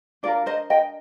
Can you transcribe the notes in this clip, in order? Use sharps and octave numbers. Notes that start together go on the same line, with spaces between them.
D4 F4 A#4 D5
C5 D#5
D#5 G5